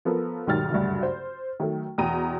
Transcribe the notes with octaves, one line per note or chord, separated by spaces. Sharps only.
F3 B3 A4 A#4
B1 G#2 D#3 G3 F6 A6
F#1 D2 G2
C5
D#3 F#3 A3
E2 B2 G5 A#5 D#7